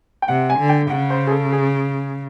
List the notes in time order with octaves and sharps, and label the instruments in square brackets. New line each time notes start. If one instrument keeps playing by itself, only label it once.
[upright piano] G5
[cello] C3 [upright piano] F#5
[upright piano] G#5
[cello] D3
[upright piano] G5
[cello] C#3 [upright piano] F#5
[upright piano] C5
G#4
A4
G#4